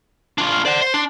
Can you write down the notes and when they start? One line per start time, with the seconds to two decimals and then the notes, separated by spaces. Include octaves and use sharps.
0.38 D4 F4
0.52 F5
0.66 C5 D5 F#5
0.81 C5 C6
0.94 D4